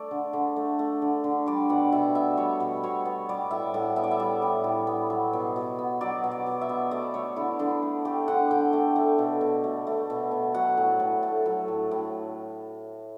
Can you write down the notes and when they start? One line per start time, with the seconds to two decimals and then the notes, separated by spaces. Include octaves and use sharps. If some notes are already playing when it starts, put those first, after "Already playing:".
Already playing: A3 D5
0.11 D3
0.33 D3
0.56 A3
0.79 A3
1.02 D3
1.24 D3
1.46 G3 D5
1.69 B2 F#5
1.92 B2 E5
2.15 B3 E5
2.37 G3 C#5
2.60 B2
2.83 B2 C#5
3.05 B3
3.29 G3 D5
3.51 A2 E5
3.74 A2 F#5
3.96 B3 E5
4.03 D5
4.11 E5
4.19 G3 D5
4.42 A2
4.64 A2
4.87 B3
5.10 F#3
5.33 B2
5.56 B2
5.79 B3
6.01 F#3 D5
6.24 B2
6.31 D5
6.46 B2
6.61 E5
6.69 B3
6.91 A3 D5
7.14 A3 C#5
7.36 D3 E4
7.59 D3 D4
7.83 A3
8.05 A3 G4
8.28 D3 F#5
8.51 D3 G5
8.73 A3
8.96 A3
9.19 B2
9.41 B2
9.64 A3
9.87 A3
10.10 B2
10.31 B2
10.54 F#3 F#5
10.77 A2
11.00 A2
11.23 A3
11.46 F#3
11.68 A2
11.91 A2